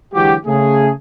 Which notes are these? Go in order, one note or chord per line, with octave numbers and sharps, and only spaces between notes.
D3 E3 F#3 G#3 F#4 G4
C#3 A3 G#4